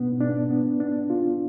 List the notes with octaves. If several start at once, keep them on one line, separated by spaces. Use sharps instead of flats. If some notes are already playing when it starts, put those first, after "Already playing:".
Already playing: B2 B3 D4
D4
B3
D4
F4